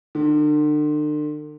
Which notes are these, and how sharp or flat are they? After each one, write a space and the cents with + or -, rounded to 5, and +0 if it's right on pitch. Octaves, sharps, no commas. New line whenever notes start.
D3 +40